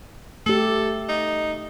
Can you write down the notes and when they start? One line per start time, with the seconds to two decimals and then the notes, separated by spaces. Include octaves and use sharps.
0.46 A3 G4 A4
1.09 D#4